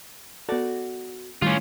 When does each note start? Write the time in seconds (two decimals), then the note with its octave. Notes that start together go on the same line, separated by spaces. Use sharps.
0.49 B3 F#4 A4 D5
1.42 A2 D#3 G3 C#4 F4